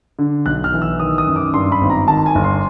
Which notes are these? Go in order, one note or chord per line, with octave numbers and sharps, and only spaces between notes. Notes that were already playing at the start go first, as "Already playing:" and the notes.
D3
B1 F#6
F6
E3
E6
D#3 D#6
D#6
F#2
D6
G2 C6
B5
G#1
A#5
D#3 A5
G#5
G1
C6